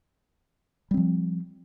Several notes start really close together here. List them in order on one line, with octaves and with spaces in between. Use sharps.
G3 C4 F3